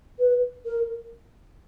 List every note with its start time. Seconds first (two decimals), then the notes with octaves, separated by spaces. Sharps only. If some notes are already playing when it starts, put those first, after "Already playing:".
0.19 B4
0.65 A#4